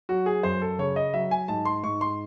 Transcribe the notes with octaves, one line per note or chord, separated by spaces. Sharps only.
F#3 F#4
G#4
F#2 C5
A4
C#3 C#5
D#5
F#3 E5
G#5
G#2 A5
C6
G#2 C#6
C6